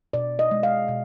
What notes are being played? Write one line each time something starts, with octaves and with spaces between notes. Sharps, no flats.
B2 D5
D#5
G#3
F5
B2